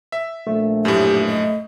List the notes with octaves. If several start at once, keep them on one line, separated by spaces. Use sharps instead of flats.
E5
A#1 A3
F#2 A2 G4
D#5